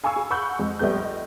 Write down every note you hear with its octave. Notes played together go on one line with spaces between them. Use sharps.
F5 G#5 B5 C#6 E6
G#4
F#5 B5 C#6 E6 F#6 G6
F2 G#3
A#1 G3 A3 B3 G6
D#5